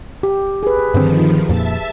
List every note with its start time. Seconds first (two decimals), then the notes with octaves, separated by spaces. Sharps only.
0.23 G4
0.63 G#4 B4
0.94 G2 D3 D#3 F3 C4
1.49 F2 A#2 E5 A5